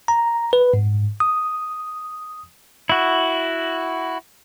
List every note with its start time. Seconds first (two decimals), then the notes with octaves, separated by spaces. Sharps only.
0.08 A#5
0.53 B4
0.74 G#2
1.20 D#6
2.90 E4 F#4